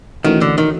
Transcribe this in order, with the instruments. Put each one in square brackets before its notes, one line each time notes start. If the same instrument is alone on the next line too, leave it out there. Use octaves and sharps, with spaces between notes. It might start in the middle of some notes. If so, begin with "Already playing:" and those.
[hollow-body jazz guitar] D#3 [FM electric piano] E3 A3 C#4 F#4
[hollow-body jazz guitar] D3
D#3